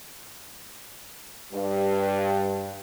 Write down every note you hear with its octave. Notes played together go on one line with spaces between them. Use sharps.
G2